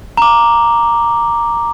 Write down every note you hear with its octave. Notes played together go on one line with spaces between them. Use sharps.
A#5 D6